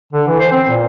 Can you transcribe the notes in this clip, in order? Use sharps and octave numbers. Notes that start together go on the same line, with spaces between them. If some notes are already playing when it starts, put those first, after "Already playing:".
D3
E3
C5
C4
A#2